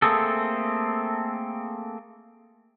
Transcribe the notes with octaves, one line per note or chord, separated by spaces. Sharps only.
A3 A#3 C4 G#4 A4